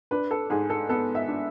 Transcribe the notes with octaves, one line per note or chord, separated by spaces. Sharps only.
D4 B4
A4
G#2 G#4
A4
B3 A4
E5
D4